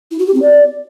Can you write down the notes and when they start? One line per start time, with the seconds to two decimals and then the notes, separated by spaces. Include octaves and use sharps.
0.11 E4
0.19 F#4
0.27 G4
0.34 C4
0.42 D5